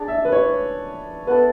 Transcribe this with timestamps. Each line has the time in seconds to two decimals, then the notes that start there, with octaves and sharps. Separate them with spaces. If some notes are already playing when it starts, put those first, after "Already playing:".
Already playing: D4 G#4 D5
0.08 E5
0.25 B4
0.32 C#5
1.27 B3 E4 A4 B4